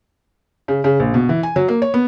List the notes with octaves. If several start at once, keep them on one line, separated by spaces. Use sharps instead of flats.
C#3
C#3
A#1
B2
E3
G#5
F#3
A#3
C#5
B3